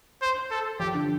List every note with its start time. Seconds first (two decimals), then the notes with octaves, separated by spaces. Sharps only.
0.22 C5
0.51 A4
0.80 F3 G4
0.95 D3